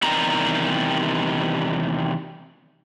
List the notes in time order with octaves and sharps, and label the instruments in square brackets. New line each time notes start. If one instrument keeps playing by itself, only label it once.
[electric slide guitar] E2 C3 D#3 G3 A#5